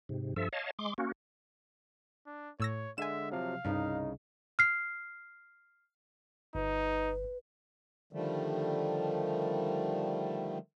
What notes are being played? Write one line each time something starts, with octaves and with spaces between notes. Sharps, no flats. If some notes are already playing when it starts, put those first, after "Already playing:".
G#2 C3
G2 F3 A4 E5
C#5 D#5 F5 A5
G#3 C6 D6
A#3 C#4 F#4
D4
A2 C#5 E6 A#6
D3 G#3 E5 G#5 E7
C3 F3 F#3 F5
C2 G2 C#3 D#4
F6 C7
G1 D#4 B4
D3 D#3 F3 G3 A3